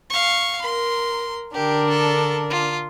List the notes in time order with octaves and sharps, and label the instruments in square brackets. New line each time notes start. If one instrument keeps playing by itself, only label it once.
[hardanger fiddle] F5 C#6
[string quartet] A#4 [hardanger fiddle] C6
[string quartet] D3 D4 A#4 [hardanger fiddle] G4
[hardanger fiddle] A4
F4